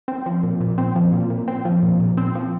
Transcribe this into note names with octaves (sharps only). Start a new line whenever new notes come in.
C4
F3
A#2
A#2
C4
F3
A#2
A#2
C4
F3
A#2
A#2
C4
F3